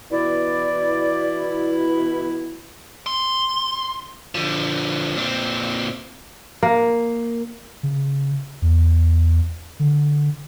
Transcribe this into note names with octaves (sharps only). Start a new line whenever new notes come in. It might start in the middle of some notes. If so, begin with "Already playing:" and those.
B2 E3 E4 D5
C6
D3 F3
A#2 C4
A#3
C#3
E2
D3